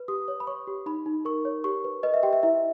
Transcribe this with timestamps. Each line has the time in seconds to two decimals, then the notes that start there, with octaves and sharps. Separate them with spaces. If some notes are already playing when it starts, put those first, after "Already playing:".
Already playing: B4
0.08 G4 D#6
0.28 C#5
0.40 B5
0.47 C#5 C#6
0.67 G4
0.86 D#4 B5
1.06 D#4
1.25 A#4 C#6
1.45 C#5
1.64 G4 C#6
1.84 B4
2.03 B4 D#5
2.14 E5
2.23 G4 G5
2.33 E5
2.43 E4 E5